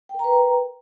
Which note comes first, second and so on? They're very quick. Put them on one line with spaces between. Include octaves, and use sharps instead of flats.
G5 A#4 A#5 B4